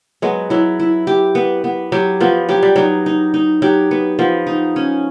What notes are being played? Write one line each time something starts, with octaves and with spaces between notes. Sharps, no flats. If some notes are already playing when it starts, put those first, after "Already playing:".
F#3 G#3 B3
F#3 E4
E4
G4
B3
B3
F#3 G4
F3 B3
F#3 G4
G3
F#3 D#4
D#4
D#4
F#3 G4
B3
F3 B3
D#4
C#4